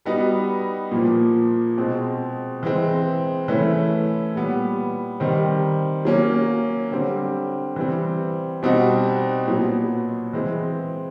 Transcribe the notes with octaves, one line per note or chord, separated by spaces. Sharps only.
G3 B3 D#4 F#4
A#2 F3 A#3
B2 G#3 C4
E3 G#3 C4
E3 A3 C#4 E4
A#2 G3 B3
D#3 G3 C4
F#3 A#3 C#4
D3 G3 C4
E3 G3 C4
B2 G3 C4 D#4 F#4
A#2 F#3 B3
E3 G#3 C4